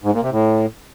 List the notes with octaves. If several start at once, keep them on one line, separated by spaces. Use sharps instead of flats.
G#2
A#2
C3
A2